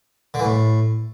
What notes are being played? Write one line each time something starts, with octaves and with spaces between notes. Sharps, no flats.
D3
E3
A2